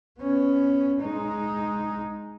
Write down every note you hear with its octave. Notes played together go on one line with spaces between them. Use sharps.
B3 C#4
G#3 D#4